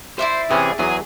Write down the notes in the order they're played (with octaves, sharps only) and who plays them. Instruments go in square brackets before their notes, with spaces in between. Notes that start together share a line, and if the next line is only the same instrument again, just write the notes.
[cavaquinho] E4 D5 E5 [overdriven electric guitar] C5
[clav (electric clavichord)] C3 E3 C#4 [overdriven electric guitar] G#4
[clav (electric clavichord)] E2 F#3 [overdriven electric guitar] G#4